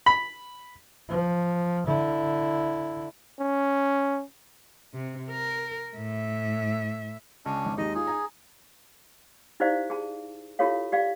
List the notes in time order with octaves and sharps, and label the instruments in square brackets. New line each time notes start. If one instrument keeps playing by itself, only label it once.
[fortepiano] B5
[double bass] F3
D3 E4
[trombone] C#4
[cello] C3
A#4
A2 E5
[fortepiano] C#2 [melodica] C#4 D4
[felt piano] G#1
[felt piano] D#2 G#3 [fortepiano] D#4 [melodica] D#5
[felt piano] F4 [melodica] G#4
[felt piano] G#5 A#5
[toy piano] D#4 E4 G4 C5 D5 F5
G#4 A5
E4 F4 G4 A4 C#5 F5
G4 D5 F5